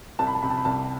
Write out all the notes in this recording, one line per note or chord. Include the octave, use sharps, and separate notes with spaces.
C2 A5
B5
A5
C3 B5
A5
B5
C2 A5